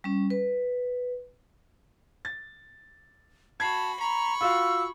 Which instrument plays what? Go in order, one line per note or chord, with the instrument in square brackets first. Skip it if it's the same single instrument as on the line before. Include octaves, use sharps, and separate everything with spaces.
[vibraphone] G3 C#4
B4
[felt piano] A6
[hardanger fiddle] F#4 B5 [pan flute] A5 [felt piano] G#6 C7
[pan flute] A#5 [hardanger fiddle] B5 C#6
[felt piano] F4 F#4 F5 [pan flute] E6